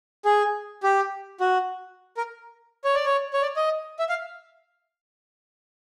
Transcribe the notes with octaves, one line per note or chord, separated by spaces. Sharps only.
G#4
G4
F#4
A#4
C#5
D5
C#5
C#5
D5
D#5
E5
F5